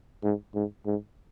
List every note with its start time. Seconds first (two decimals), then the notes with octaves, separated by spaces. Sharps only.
0.24 G#2
0.54 G#2
0.86 G#2